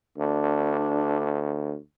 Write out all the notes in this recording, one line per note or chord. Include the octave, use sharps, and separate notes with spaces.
D2 D4